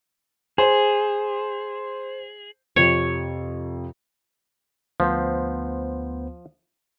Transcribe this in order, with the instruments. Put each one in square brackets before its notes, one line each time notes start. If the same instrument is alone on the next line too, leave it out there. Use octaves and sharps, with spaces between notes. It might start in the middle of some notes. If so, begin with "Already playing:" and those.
[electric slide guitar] G#4 [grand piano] C5
[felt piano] F2 C3 F4 [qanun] C#5
[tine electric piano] D2 B3 C5 [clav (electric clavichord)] F3